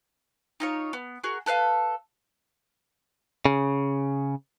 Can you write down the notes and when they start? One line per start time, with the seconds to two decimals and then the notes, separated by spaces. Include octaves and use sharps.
0.60 D#4 F4 C#5
0.93 B3
1.24 F#4 G#4 A#4
1.46 A4 B4 C#5 F5
3.45 C#3